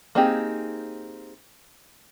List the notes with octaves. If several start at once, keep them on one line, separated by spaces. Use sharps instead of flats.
A#3 C4 D#4 G4 G#4